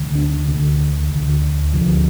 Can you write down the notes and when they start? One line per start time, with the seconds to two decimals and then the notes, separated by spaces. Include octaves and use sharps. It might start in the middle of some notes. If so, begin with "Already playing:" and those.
Already playing: D2 D3
0.15 D4
0.47 D2 D3
1.10 D2
1.15 D3
1.73 D2 D3 F3